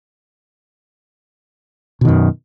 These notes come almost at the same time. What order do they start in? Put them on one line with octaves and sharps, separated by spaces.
B2 D#3 F#2